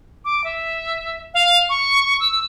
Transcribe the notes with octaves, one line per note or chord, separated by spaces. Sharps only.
D6
E5
F5
C#6
E6